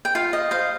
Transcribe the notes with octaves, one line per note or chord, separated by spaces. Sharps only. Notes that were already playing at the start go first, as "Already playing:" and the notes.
G5
F4 F5
D#5
C5 F5